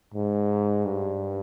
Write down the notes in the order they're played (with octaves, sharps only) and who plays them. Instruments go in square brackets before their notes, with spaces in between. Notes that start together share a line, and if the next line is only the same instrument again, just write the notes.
[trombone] G#2
G2